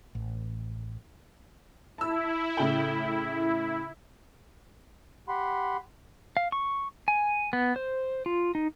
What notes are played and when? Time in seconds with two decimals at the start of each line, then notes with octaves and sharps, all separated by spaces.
0.15 A1
1.98 E4 A5 E6
2.57 A2 C#3 G5
5.28 G4 F#5 B5 C6
6.37 F5
6.52 C#6
7.08 G#5
7.53 B3
7.76 C5
8.26 F4
8.55 D#4